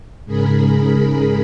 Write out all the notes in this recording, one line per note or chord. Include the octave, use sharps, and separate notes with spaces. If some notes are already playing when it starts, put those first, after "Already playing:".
G#2 C#3 G#4 A#4 B5